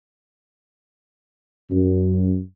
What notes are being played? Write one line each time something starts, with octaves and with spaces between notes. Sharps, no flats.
F#2